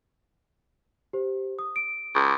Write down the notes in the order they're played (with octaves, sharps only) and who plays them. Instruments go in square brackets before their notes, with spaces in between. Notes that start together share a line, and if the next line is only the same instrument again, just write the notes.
[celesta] G4 C5
D#6
D7
[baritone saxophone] C#2